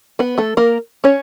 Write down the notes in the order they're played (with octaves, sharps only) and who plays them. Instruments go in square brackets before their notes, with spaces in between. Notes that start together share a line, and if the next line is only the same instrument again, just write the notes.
[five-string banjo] B3 B4
A3 A4
A#3 A#4
C#4 C#5